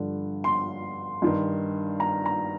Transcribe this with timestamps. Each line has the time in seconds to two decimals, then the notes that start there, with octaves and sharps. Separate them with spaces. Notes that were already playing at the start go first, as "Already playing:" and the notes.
Already playing: G2 D3 F3
0.44 C6
1.22 G2 D#3
2.00 A#5
2.26 A#5